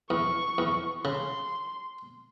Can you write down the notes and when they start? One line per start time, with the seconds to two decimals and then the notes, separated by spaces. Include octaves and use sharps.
0.10 E2 C#6
0.58 E2
1.05 C#3 C6